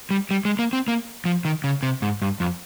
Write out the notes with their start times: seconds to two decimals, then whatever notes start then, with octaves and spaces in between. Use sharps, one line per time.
0.11 G3
0.31 G3
0.45 G#3
0.59 A#3
0.73 C4
0.88 A#3
1.25 F3
1.45 D#3
1.64 C#3
1.83 C3
2.02 G#2
2.22 G2
2.40 F2